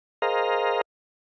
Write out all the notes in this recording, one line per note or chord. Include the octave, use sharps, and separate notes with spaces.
G#4 A#4 C5 D#5 F5 A#5